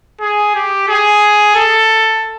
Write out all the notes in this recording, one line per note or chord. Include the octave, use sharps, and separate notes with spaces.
G#4
G4
G#4
A4